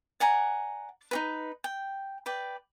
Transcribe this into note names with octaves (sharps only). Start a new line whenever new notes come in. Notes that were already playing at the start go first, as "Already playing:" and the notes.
D5 F#5 G#5 A#5
D#4 F#4 B4
G5
B4 D5 G5